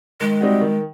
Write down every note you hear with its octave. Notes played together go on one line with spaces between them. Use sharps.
D#3 G#3
G3 C4 D#4 F#4
D#3